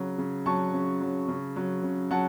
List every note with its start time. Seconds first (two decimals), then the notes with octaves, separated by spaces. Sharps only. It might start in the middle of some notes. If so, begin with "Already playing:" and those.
Already playing: C#3 F#3
0.18 C#3
0.46 F#3 A5 C#6
0.73 C#3
1.01 F#3
1.28 C#3
1.56 F#3
1.83 C#3
2.10 F#3 F#5 A5